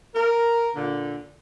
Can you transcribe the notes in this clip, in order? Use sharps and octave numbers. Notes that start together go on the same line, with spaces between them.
A#4
A#2 D3